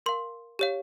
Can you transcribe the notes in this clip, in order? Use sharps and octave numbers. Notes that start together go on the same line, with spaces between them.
A#4 F5 C6
G4 C#5 F5